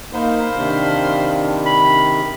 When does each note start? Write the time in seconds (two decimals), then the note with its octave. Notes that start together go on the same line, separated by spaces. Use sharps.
0.13 A#3 D#4 C5 F5 B5
0.57 C3 D#3 D4
1.66 B5